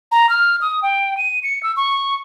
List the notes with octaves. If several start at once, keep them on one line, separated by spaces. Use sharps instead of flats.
A#5
F6
D#6
G5
D#7
C#7
E6
C#6